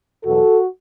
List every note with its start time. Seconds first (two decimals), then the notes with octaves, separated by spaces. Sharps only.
0.25 E2 B2 F#3 B3 F#4 A4